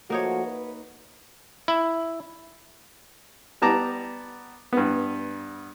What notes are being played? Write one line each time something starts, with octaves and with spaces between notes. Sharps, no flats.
F3 A3 A#3 D#4 F#4 C#5
B4
E4
G3 B3 A5 A#5 D6
G2 B3